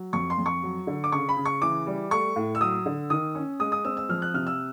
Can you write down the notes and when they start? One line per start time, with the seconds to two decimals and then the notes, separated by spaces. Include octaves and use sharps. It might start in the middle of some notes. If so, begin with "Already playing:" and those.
Already playing: F#3
0.13 F2 C#6
0.30 C6
0.38 F2
0.46 C#6
0.63 F#3
0.87 D3
1.04 D6
1.12 C#3 C#6
1.29 B5
1.37 C#3
1.45 C#6
1.62 E3 D6
1.87 G3
2.11 A3 C#6
2.36 A2
2.55 E6
2.61 F#3 D#6
2.86 D3
3.10 D#3 D#6
3.35 C#4
3.59 G#3 D#6
3.72 D#6
3.85 C4 E6
3.97 E6
4.09 F3 F6
4.22 F#6
4.34 C3 F6
4.47 E6